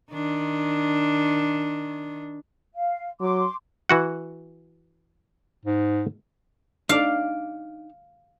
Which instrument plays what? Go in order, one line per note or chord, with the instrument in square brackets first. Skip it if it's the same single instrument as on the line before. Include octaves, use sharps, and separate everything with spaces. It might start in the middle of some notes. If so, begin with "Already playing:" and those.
[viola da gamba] D#3 D4
[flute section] F5
[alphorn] F#3 [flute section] C6 D6
[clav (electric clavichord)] E3 F#4 F#5
[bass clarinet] G#2
[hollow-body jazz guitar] D4 D#4 D5 [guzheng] F5